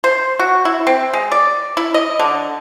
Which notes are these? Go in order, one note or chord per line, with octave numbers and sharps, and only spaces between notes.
C5
F#4
E4
C4
G#3
D5
E4
D#5
D3